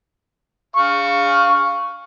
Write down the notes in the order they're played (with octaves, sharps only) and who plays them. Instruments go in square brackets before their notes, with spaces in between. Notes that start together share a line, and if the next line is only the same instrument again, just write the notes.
[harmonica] F5 C#6